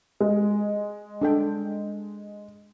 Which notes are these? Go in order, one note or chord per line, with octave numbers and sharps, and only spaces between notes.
G#3
D4 A4 G5